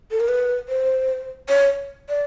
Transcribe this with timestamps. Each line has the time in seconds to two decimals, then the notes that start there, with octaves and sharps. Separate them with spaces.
0.11 A4
0.20 A#4
0.28 B4
0.69 C5
1.49 C#5
2.09 D5